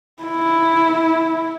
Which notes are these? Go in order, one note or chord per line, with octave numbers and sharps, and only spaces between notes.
E4